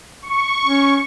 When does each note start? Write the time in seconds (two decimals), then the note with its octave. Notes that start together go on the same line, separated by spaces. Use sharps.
0.22 C#6
0.65 C#4